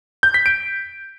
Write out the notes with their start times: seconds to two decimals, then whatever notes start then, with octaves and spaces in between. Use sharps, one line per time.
0.23 G6
0.34 B6
0.46 D7